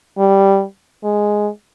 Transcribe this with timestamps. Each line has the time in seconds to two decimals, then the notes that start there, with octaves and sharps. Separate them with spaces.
0.18 G3
1.04 G#3